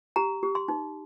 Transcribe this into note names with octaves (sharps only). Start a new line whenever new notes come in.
G4 A#5
G4
C6
D#4